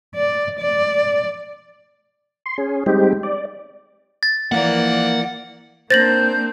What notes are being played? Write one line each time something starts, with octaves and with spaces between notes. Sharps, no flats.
D5
D5
C6
C#4 G#4
G3 G#3 C4 D#4 G4
D5
A6
E3 F3 A#3 D5 F#5
A#3 C4 D4 C5 G6 A6 A#6 F#7